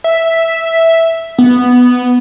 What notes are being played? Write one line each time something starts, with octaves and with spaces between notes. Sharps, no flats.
E5
B3